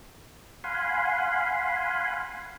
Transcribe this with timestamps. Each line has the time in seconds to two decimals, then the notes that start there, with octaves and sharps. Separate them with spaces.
0.64 F5 F#5 G#5 B5 C6